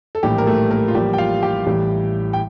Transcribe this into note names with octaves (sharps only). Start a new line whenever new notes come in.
A4
A#1 A2 E3 G3 A#3 G4
A#4
A3 A4
A#3 A#4
F4
A1 A2 F3 G3 A#3 G4
G5
F4 F5
G4 G5
A1 A2 E3 G3
G5